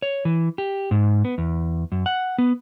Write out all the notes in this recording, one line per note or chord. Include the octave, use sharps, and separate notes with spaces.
C#5
E3
G4
G#2
B3
E2
F#2
F#5
B3